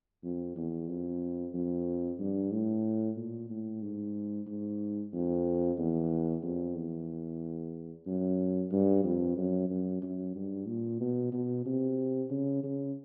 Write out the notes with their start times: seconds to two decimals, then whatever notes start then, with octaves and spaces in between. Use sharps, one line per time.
0.24 F2
0.56 E2
0.88 F2
1.54 F2
2.19 G2
2.52 A2
3.16 A#2
3.50 A2
3.82 G#2
4.47 G#2
5.13 F2
5.79 E2
6.43 F2
6.75 E2
8.07 F#2
8.72 G2
9.04 F2
9.38 F#2
9.70 F#2
10.02 F#2
10.35 G2
10.67 A#2
11.01 B2
11.33 B2
11.66 C3
12.31 C#3
12.64 C#3